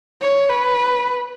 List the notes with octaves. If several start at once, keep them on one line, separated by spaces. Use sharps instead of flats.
C#5
B4